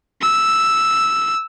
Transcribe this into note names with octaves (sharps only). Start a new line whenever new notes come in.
E6